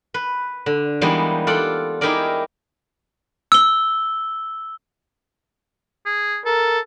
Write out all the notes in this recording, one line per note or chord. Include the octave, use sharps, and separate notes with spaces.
B4
D3
E3 G3 G#3 A#3 B3 D#4
F4 A4 D5 F#5 G5
D#4 E4 G4 G#4 A#4 D5
E6 G7
G#4
A4 A#4